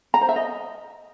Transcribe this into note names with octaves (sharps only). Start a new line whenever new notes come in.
A#5
C5
E5
D#5